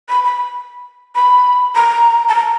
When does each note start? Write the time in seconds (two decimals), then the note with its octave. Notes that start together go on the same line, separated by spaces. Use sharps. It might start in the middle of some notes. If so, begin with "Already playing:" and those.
0.09 B5
0.24 B5
1.15 B5
1.75 A#5
2.29 A5
2.35 A#5